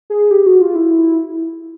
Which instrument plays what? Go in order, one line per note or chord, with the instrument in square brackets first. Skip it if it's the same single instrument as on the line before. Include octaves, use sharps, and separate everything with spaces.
[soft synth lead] G#4
G4
F#4
F4
E4